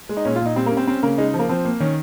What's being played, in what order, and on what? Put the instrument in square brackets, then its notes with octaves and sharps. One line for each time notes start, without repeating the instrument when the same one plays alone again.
[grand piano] G#3
[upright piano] D#4
[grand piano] A#2 [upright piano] C#4
[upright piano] F4
[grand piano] A#2 [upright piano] D#4
[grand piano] G3 [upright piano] C4
[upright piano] A#3
[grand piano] C#4
[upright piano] C4
[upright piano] C4 [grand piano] C#4
[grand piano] C#3 [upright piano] A#3
[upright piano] G#3 [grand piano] D#4
[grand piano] F3
[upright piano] A#3
[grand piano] F3 [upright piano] C4
[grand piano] A#3
[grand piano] D#3 [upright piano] C#4